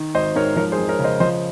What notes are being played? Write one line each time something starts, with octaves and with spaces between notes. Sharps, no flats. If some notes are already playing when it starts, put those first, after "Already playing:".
Already playing: D#3
G#1 C5 D#5
G#2 A#4 C#5
F3 A#4 C#5
G#4 C5
F2
A#4 C#5
C#3
C5 D#5
F3 C5 D#5